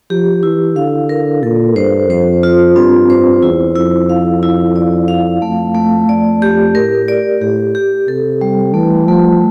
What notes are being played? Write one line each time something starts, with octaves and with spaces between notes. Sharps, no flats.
F3 G4
E3 E4
D3 F5
A#4
A#2 A4
G2 C5
F2 C5
F4
G2 C4
C5
E2 E4
F2 E4
F5
E4
D5
F5
F2 A3
A3
F2 D5
G4
A2 A#4
D5
A2 G4
G4
C3 A4
G3
E3 A3
F3 A3